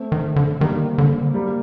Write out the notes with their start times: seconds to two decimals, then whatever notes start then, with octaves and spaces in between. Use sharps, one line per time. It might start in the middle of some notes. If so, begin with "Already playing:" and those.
Already playing: A3 C4
0.12 D#3
0.36 D3
0.60 D#3 G3 A#3
0.98 D3
1.34 G3 A#3